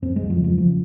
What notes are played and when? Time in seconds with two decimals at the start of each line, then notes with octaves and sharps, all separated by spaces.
0.02 F2 C4
0.16 F2 G#3
0.30 F3
0.39 C#3
0.44 F3
0.58 C#3 F3